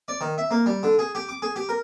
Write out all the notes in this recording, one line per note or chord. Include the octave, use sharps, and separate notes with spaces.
D5
D#3
E5
A#3
G3
D3
G#4
G4
D6
G#4
G4
A#4